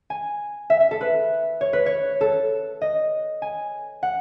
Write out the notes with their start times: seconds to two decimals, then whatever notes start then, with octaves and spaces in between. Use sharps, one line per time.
0.10 G#5
0.70 E5
0.80 E5
0.91 A4
1.01 B4
1.61 C#5
1.73 B4
1.86 C#5
2.21 A4
2.81 D#5
3.42 G#5
4.03 F#5